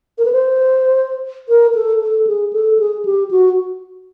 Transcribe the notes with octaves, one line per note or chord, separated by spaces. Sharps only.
A#4
B4
C5
A#4
A4
A4
G#4
A4
G#4
G4
F#4